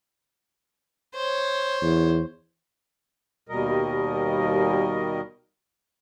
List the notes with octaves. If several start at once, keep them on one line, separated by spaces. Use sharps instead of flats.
C5 C#5
E2
D#2 B2 G3 A#4 D#5